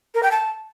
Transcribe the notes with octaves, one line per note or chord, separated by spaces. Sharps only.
A#4
G5
A5